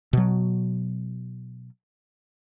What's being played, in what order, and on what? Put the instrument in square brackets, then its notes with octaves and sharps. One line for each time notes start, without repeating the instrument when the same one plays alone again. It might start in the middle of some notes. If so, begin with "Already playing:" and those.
[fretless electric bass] B2 F#3